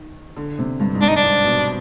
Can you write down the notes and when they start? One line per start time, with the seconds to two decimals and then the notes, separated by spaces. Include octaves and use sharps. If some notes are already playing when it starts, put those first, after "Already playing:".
Already playing: D#3
0.37 D3
0.59 C3
0.80 G2
0.94 G#2
1.01 G2 D4
1.09 D#4
1.16 D4
1.23 G#2
1.44 B2